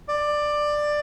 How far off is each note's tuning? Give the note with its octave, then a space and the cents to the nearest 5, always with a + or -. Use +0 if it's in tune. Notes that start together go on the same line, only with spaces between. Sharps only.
D5 +15